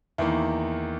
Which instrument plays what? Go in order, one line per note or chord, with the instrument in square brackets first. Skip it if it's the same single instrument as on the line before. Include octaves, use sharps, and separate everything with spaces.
[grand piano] E2 D#3 A#3 E4